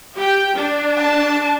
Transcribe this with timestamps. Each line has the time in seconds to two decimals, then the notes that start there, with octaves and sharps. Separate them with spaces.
0.16 G4 G5
0.55 D4
0.98 A5